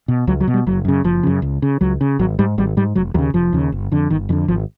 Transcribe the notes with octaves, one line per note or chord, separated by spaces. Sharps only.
B2
C#2 F#3
F#3
B2
G3
F#1 F#3
F#2 C#3
F#1 F3
F#2 C#3
C#2
C#3
C#2 F#3
C#3
G#1 F#3
G#2 G3
G#1 G3
G#2 G3
F1 F#3
D#2 C#3 F#3
F1 F3
D#2 C#3
G1
F2 D3
G1 D#3
F2 D3 E3
G#1 F3